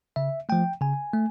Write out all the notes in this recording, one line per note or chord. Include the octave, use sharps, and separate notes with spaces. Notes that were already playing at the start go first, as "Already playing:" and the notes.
C#3 E5
F3 A3 G5
C#3 G#5
A3